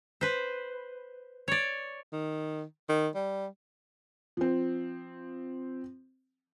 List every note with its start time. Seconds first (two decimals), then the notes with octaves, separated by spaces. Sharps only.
0.21 B4 C5
1.48 C#5 D5
2.13 D#3
2.89 D#3
3.15 G3
4.37 F3 C4